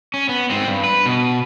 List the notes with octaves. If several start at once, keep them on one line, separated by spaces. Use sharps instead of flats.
C#4
B3
G#2 C4
G2
B4
B2